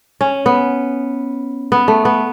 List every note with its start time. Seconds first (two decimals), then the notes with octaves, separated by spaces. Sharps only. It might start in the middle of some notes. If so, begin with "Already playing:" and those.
0.21 C#4
0.46 B3
1.72 B3
1.88 A3
2.05 B3